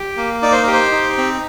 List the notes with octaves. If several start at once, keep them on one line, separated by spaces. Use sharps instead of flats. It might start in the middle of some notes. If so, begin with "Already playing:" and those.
Already playing: G4
A#3
D#4 D5
C5
G4 A#4
C5
D#4
C4